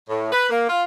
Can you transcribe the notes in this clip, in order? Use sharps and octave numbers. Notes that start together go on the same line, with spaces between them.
A2
B4
A#3
F4